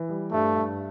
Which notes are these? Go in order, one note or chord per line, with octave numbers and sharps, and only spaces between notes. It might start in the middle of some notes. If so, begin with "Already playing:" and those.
Already playing: E3
G3
G2 A3
G2